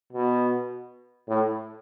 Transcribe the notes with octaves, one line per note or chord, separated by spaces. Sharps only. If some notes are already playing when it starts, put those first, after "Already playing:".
B2
A2